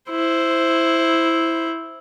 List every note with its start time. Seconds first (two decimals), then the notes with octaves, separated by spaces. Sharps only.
0.10 E4 C5